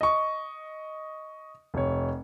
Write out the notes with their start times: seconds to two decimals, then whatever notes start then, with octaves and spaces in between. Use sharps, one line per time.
0.01 D#5 C#6
1.74 F1 C#5